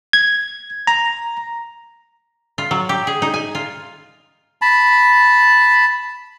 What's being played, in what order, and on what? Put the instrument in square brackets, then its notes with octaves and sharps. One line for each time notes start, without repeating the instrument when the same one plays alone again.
[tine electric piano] G#6
A#5
[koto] F4
F#3
G4
G#4
D#4
G#5
F4
[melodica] A5 B5